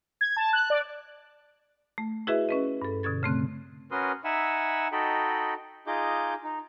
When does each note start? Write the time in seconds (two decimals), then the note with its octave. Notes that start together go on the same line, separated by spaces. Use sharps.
0.21 G#6
0.37 A5
0.53 F#6
0.70 D5
1.98 A3
2.27 E4 F#4 G#4 B4 D#5 E5
2.49 C#4 B4 D#5
2.82 G2 A4
3.03 B2 D3 C#4 G#6 A6
3.23 C#3 A3 C4 F#6
3.91 C#4 F#4 A#4 B4 C6 D#6
4.24 D#4 E5 F#5 G#5 B5 E6
4.92 D#4 F#4 A4 D#5 G5 B5
5.87 D#4 F4 G#4 D#5 D6 G6
6.44 D#4